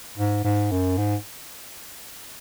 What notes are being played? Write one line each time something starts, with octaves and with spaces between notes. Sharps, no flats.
G#2
G#2
F#2
G#2